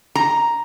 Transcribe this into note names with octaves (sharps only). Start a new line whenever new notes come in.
A#5